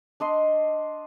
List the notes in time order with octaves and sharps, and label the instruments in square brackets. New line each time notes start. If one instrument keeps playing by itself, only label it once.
[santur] D4 D#5 C6